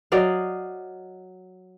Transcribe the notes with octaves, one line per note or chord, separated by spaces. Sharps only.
F#3 D5 D#5 F5